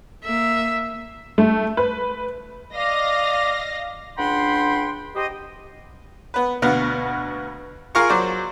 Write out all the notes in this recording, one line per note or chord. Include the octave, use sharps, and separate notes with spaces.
A#3 E5
A3
B4
D5 D#5 F5 A#6
C#2 D4 F#5 G5 B5 C6
G4 C5 D#5
B3 B4
D2 B2 B3 F5 F#5
F4 G#4 A#4 F5 A#5 C#6
F#3 C5 D5